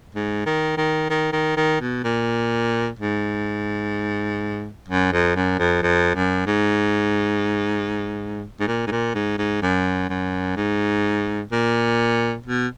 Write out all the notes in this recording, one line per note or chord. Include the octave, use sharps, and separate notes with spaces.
G#2
D#3
D#3
D#3
D#3
D#3
B2
A#2
G#2
F#2
F2
F#2
F2
F2
F#2
G#2
G#2
A#2
G#2
A#2
G#2
G#2
F#2
F#2
G#2
A#2
B2